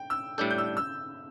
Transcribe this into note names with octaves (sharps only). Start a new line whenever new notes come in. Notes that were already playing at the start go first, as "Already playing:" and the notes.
Already playing: G5
E6
A2 G3 D4 A4 G6
G6
E6
E6